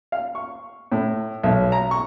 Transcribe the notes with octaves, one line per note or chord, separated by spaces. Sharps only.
F5
C#6
A2
B1
A#5
C#6